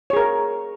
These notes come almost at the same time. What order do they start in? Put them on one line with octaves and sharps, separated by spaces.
C#5 G#4 A#4